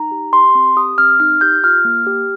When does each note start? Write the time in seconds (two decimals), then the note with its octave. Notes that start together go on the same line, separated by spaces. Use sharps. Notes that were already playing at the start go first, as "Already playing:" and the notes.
Already playing: D#4 A#5
0.11 G4
0.33 G4 C6
0.55 C4
0.76 G4 D#6
0.98 C4 F6
1.20 D#4 F6
1.41 G4 G6
1.64 F4 F6
1.85 A#3
2.07 G4